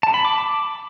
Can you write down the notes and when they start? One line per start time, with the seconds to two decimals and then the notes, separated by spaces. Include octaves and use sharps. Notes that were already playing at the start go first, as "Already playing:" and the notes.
0.03 A5
0.14 B5
0.25 D6